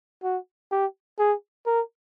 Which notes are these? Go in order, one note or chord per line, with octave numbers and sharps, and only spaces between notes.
F#4
G4
G#4
A#4